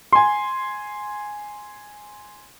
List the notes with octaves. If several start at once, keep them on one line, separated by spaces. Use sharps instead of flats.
G#5 C6